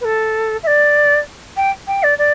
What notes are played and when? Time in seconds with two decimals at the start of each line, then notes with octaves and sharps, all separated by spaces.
0.01 B4
0.04 A4
0.63 E5
0.67 D5
1.57 G5
1.87 G5
2.03 D5
2.18 D5